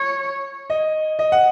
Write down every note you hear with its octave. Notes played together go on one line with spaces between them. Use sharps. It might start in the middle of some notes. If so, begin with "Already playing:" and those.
Already playing: C#5
D#5
D#5
F#5